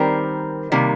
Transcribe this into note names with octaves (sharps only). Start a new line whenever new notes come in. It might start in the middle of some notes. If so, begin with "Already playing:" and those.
Already playing: D#3 G3 C4 A#4
C3 D#3 G3 A#3